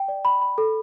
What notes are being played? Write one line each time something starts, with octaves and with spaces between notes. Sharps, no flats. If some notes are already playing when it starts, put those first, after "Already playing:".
Already playing: G5
D5
B5
B5
A4